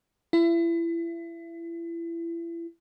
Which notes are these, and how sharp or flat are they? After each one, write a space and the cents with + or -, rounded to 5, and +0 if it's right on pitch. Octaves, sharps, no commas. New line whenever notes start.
E4 +30